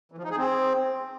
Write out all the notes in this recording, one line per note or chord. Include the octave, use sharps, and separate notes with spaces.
E3
F3
D#4
G#4
C4